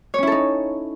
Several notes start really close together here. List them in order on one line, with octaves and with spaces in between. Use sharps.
C#5 C#4 E4 A4 D#4